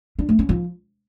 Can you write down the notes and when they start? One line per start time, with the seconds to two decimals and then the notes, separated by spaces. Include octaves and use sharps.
0.19 D4
0.29 A3
0.39 C#4
0.49 F3